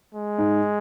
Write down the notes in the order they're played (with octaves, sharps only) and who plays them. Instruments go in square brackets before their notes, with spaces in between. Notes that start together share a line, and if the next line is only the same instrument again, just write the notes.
[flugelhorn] G#3
[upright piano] G#2